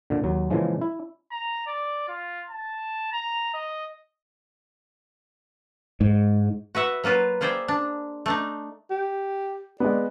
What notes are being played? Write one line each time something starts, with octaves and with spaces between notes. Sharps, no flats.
A#2 D3
D#2 F#3
A#2 C#3 E3 F3 G#3
E4
A#5
D5
F4
A5
A#5
D#5
G#2
F#4 B4 E5 F#5
F#3 A#3 F4 B4
A#3 G#4 C5 D5 E5 G5
D4
A3 D4 D#4
G4
G#3 B3 D5